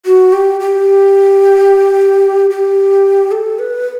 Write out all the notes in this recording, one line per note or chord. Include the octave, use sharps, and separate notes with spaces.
F#4
G4
G4
G4
A4
B4